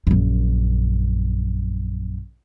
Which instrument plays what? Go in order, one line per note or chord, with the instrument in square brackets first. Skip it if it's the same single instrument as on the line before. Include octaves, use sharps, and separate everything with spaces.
[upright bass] A#1 F#2